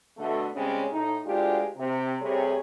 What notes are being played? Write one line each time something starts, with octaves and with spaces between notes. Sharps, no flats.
B2 D3 A3
C#3 G3 G#3 C4 C#4
A2 D#4
D2 G#3 D4 F4 G4
C3
C3 G3 A3 G#4 C#5